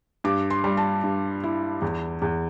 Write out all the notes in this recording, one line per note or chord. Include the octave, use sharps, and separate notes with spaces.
G2 D6
C6
G3
A5
G2
E4
E2
E2